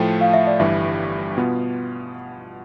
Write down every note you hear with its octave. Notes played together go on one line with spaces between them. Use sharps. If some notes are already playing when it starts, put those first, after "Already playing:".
Already playing: A2 F3 A3 G5
F5
E5
D5
G1 G2 E3 G3 E5
B2 B3 F4